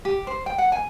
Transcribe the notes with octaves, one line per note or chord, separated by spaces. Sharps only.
G4
C5
G5
F#5
G#5